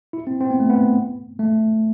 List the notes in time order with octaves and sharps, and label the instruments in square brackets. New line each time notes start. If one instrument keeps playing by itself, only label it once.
[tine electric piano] E4
C4
C4
B3
A3
B3
A3